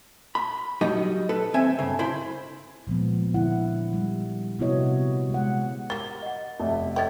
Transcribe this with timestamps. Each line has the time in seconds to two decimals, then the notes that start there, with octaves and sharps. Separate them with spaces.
0.35 B5
0.81 F#3 G3 D#4 D#5
1.29 A4 B4
1.54 D#2 C4 E5 G#5
1.79 G2 C#3
1.99 E4 C5 B5
2.87 A#2 F3 G#3 B3
3.34 D3 E4 F#5
3.93 G3
4.59 C3 B3 E4 F#4 C#5 D#5
5.30 G#3 F#5
5.90 G3 A#3 A6 G7
6.22 D#5 F#5
6.60 F1 E5
6.96 C#4 A4 C#5 D#5 G5 A6